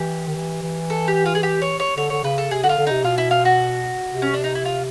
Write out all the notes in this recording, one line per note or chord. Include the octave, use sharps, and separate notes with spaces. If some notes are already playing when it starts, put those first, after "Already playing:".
Already playing: E3 G4
D#3
E3
E3
A4
G4
F4
G#4
G4
C#5
C#5
D3 C#5
D3 C#5
C#3 B4
A4
C3 G#4
D3 F#4
F4
D3
C3 D#4
B2 F4
E4
F4
F#4
C3
C#4
D4
D#4
E4
F4